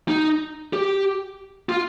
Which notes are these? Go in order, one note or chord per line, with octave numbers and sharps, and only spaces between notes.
D#4
G4
F4